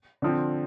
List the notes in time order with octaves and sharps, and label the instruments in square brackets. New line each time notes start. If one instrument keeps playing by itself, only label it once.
[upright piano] D3 F3 C4